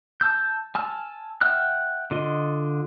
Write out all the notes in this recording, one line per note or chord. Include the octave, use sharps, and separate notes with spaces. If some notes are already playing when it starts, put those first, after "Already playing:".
A5 E6 G6
G#5 A5 E6 F6
E5 F#5 G5 F6 F#6
D3 F4 D#5